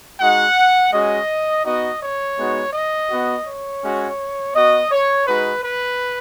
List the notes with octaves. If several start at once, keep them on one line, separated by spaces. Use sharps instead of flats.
G#3 D#4 F#4 F#5
G#3 C#4 F#4 D#5
B3 D#4 F#4 D#5
C#5
G#3 B3 D#4 F#4
D#5
B3 F#4
C#5
G#3 C#4 F#4
B3 F#4 D#5
C#5
G#3 D#4 F#4 B4
B4